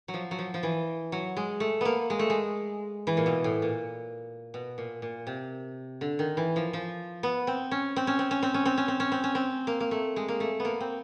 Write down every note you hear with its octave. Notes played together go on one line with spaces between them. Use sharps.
F#3
F3
F#3
F3
F3
E3
F#3
G#3
A3
A#3 B3
G#3
A3
G#3
E3
A#2
B2
A2
A#2
B2
A#2
A#2
C3
D3
D#3
E3
F3
F3
B3
C4
C#4
C4
C#4
C4
C#4
C4
C#4
C4
C#4
C4
C#4
C4
C#4
C4
A#3
A#3
A3
G#3
A#3
A3
B3
A#3
C4